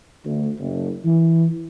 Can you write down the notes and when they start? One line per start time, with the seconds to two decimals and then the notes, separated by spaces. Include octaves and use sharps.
0.25 D2
0.59 F#1
1.05 E3